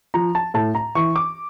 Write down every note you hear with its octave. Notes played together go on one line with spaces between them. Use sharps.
F3 A#5
A5
A2 A5
A#5
E3 C#6
D6